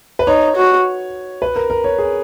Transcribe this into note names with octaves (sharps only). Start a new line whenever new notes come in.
B4
D#4 C#5
F#4
B4
A#4
A#4
C#5
G#4